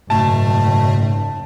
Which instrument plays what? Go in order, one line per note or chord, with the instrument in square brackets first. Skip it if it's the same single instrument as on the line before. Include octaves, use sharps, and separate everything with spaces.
[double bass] F#1 [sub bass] G#2 [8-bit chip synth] B2 A3 [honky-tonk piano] A5